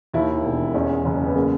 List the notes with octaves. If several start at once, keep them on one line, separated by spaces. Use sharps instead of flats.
D#2 E4
E1
E2 C#4
F#1
B3
C#3 A#3